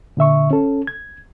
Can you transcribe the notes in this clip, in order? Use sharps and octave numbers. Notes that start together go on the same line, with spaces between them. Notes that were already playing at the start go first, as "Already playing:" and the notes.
A#2 D3 E5 C#6
C#4 A4
G#6